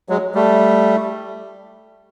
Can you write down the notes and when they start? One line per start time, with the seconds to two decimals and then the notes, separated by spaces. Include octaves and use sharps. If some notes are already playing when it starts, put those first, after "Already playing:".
0.09 F#3 G#3
0.35 G3 A3